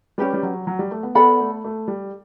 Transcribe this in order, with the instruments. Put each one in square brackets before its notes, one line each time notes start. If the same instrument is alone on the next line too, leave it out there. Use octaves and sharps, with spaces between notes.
[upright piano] G3 [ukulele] C#4 G4 B4
[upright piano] G3
F#3
F#3
G3
A3
B3
[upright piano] B3 [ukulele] A4 D5 F#5 B5
[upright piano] A3
A3
G3